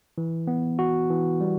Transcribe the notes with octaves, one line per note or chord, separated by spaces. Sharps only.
E3
B3
F#4
E3
G3